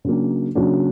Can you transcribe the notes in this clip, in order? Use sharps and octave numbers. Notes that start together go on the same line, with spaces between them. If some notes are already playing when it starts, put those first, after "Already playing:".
C#3 F#3 A#3 D4
C#3 F#3 A#3 D4